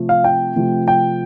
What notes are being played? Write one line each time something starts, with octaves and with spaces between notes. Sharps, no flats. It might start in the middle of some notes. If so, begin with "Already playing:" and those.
Already playing: C3 F3 A3
F5
G5
C3 F3 A3
G5